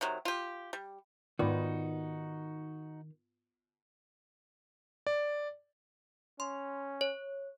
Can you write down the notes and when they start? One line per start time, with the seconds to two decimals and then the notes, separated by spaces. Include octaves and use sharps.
0.01 C3 D#3 F#3
0.25 F4 G4
0.73 G3
1.39 G#2 D#3 B3 D#4 F4 F#4 B4 D5
5.07 D5
6.40 C#4 C6
7.01 C#5